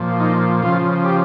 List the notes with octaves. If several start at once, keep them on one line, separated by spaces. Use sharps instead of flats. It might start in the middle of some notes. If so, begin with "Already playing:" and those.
Already playing: A#2 F3
D#4
C#3 F3 F4
G4